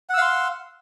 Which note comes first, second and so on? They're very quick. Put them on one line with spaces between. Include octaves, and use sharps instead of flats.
F#5 E6 F5 C6